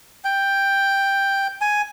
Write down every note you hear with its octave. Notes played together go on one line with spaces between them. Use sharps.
G5
G#5